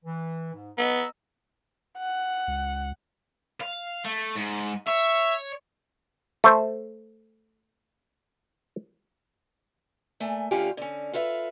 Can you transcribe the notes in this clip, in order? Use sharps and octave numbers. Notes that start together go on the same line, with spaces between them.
E3
G#2
B3 D#5 A#5 E6
F#5
C#2
F5
A3
G#2
C#5 E5
A3 C5
A#2 A3 G#5
D2 D3 C#4 F4 G4 G#5
D3 C#4
F4 A4 B4 E5 F5